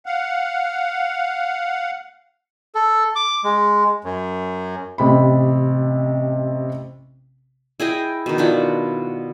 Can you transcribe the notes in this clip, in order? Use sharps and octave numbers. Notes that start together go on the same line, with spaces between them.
F5 F#5
A4
D6
G#3
F#2
A1 C3 B5
E4 G#4 D#5 G5
B2 D#3
D#3 D4 E4 F4